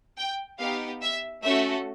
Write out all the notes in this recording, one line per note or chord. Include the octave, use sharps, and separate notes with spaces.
G5
B3 D#4 G4 F5
E5
A3 C#4 F#4 A4 E5